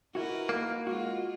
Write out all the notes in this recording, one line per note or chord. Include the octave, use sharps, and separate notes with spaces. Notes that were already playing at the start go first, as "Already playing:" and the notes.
D#4 E4 F#4 A#4 B4
A#3
G#3 F4 F#4